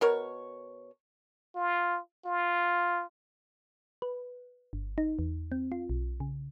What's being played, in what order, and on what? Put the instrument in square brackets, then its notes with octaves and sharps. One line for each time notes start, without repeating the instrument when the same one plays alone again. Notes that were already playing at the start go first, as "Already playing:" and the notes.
[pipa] B2 A#4 C#5
[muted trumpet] F4
F4
[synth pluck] B4
G1
D#4
E2
C4
F4
B1
C#3